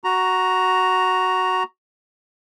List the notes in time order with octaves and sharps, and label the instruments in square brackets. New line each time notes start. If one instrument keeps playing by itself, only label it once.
[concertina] F#4 A#5